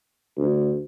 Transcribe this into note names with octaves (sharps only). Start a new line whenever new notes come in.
D2